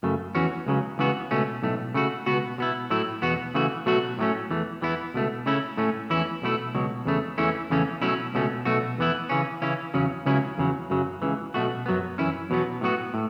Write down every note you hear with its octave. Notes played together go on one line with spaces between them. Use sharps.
F#2 C#3 A3
E2 E3 C#4 F#4
C#2 C#3 F#3
C#2 C#3 E3 B3 F#4
C#2 B2 A3 C#4
B1 A2 A3
C#3 A3 F#4
C#2 B2 B3 F#4
B2 B3 E4
A2 F#3 A3 E4
E2 B2 B3 F#4
C#3 E3 A3 F#4
B2 F#3 A3 F#4
A2 F#3 A3 C#4
E2 E3 A3
E2 E3 B3 E4
C#2 B2 A3
C#3 A3 C#4 E4
A2 A3 C#4
E2 E3 C#4 E4
B1 B2 A3 E4
C#2 B2 F#3
E2 C#3 A3
E2 E3 A3 C#4 E4
E2 C#3 E3 A3 C#4
B2 F#3 A3 C#4 E4
C#2 B2 A3 C#4
B1 B2 A3 F#4
E2 E3 B3 E4
C#3 E3 C#4
C#3 E3 C#4 E4
E2 C#3 F#3 C#4
C#2 C#3 F#3 C#4 E4
E2 C#3 F#3
F#2 C#3 F#3
C#2 C#3 E3
B1 B2 A3 F#4
F#2 F#3 B3
F#2 E3 C#4 E4
E2 B2 F#3 B3
A2 F#3 B3 F#4
A2